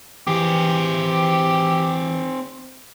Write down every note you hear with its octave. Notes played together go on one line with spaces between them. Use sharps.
E3 C4 G4 G#4